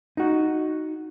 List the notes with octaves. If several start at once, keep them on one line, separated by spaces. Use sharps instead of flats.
D#4 F#4